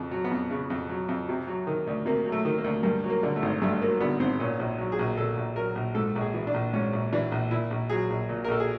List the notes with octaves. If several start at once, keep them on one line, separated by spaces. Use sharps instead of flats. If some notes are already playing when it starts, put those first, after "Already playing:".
Already playing: F2 C#3
F#3
B3
F2
C#3
F2
F#3
F2
C3
F#3
D#3
D2
C3 A#3
F#3
A3
D#3
A#3
D2
G2 A#3
F#3
A#3
D3
A3
G#1
G2 A3
F#3 A#3
D3 B3
G#1 C4
A#2 C#4
A#1
F#3
G#4
A#1
A#2 A4
A#1
F#3 A#4
A#1
G#2 A4
A#1
G#4
E3
D4
A#1
G#2 C#4
A#1
E3 D4
A#1
A#2 E4
A#1
F#3 G#4
A#1
A#2
A#4
A#1 A4
G#4